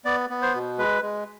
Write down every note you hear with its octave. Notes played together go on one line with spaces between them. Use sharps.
B3 D5
B3
C5
B2
G#3 B4
G#3